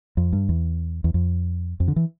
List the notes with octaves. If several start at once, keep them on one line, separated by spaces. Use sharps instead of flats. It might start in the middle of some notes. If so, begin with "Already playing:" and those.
F2
G2
E2
E2
F2
F2
D3
E3